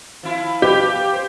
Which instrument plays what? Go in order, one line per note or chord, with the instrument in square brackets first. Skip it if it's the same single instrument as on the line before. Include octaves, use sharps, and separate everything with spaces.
[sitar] F3 E4 F4
[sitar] F3 B4 [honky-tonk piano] G4
[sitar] C5